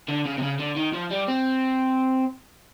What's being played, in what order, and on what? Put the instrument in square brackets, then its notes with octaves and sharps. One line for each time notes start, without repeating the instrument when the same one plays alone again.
[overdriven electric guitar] D3
C#3
C3
C#3
D3
D#3
F3
G3
C4